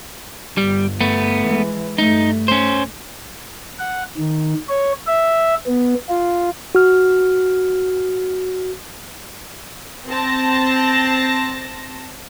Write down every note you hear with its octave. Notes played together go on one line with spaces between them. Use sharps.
G1 G3
A3 B3
E3 G#3
G2 A3 D#4
C#4 C5
F#5
D#3
C#5
E5
B3
F4
F#4 F6
C4 A5 A#6